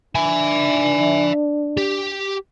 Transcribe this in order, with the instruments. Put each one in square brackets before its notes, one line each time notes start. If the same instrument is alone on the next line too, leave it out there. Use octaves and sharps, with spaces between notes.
[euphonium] D4 [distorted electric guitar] E5 G#5
[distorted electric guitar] G4